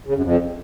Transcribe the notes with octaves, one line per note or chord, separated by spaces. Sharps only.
C#3
F#2
F2